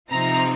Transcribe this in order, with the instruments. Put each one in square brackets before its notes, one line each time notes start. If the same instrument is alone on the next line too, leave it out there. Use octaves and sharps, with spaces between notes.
[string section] C3 F3 C4 D#4 A#5